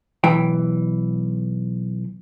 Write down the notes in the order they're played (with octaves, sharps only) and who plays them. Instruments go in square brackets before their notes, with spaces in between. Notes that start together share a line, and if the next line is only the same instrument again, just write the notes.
[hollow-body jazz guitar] B1 E3 G5